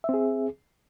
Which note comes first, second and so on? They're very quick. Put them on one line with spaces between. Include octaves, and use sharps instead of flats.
E5 C4 G#4